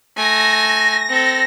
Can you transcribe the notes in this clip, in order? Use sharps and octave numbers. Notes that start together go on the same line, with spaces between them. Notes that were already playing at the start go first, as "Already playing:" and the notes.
A3 G#5 A#6
C4 A4